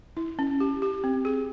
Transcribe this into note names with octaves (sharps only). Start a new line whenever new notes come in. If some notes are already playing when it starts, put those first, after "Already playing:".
E4
C#4
G4
G4
C4
G#4